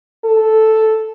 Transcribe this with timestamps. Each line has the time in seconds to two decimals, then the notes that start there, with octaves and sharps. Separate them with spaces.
0.25 A4